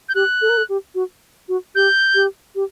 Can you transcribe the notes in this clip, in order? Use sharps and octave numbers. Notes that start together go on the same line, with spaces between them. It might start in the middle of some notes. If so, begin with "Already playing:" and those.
G6
G4 F#6
A4
A#4
A4
G4
F#4
F#4
G4 G6
G4
G4